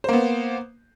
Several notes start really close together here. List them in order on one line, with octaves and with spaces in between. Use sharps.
C5 A#3 B3